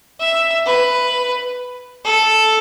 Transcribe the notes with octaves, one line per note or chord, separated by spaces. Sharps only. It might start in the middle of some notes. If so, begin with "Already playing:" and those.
E5
B4
A4